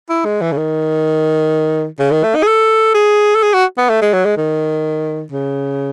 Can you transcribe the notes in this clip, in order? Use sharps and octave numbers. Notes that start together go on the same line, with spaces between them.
E4
G#3
E3
C#3
D#3
C#3
D#3
A3
D#4
G#4
A4
G#4
A4
G#4
F#4
B3
A3
G#3
F#3
G#3
D#3
C#3